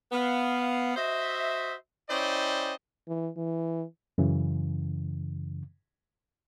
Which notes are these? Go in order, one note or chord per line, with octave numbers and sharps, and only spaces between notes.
B3 F5
F#4 C5 D#5 E5
C#4 E4 C5 D5 D#5 G5
E3
E3
F#2 C#3 E3